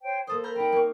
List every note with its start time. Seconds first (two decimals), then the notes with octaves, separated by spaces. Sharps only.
0.01 C5 C#5 G5
0.27 A#3 A4 C5 D#6
0.44 A#5 B5 F6 G6
0.56 C4 D#4 G5 B5
0.72 A#3 C#6